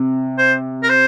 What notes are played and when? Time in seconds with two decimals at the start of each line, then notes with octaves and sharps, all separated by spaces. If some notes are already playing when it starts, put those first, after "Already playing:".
Already playing: C3
0.38 C5
0.83 A#4
0.89 C5